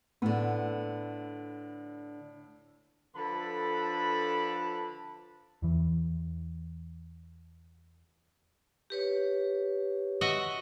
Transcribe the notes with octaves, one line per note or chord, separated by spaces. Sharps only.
A2 D3 B3
D3 F3 A4 B4 A5 B5
E2 E3
G4 B4 C#5
F#4 D#5 E5